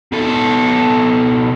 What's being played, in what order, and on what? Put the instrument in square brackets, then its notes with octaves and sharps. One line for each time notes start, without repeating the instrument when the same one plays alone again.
[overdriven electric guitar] B2 A4